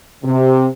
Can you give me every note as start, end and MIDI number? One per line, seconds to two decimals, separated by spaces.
0.24 0.67 48